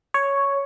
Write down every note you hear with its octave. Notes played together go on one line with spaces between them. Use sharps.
C#5